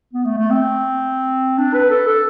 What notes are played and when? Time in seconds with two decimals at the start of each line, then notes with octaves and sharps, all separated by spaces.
0.13 B3
0.26 A3
0.38 A3
0.50 C4
1.58 D4
1.74 B4
1.90 A4
2.07 A4